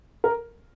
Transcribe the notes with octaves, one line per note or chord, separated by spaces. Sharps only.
A#4